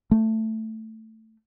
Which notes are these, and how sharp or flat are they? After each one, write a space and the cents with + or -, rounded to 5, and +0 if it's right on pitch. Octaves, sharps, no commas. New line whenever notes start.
A3 +10